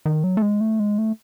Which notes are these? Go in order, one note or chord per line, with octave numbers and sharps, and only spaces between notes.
D#3
F#3
A3
G#3
A3
G#3
A3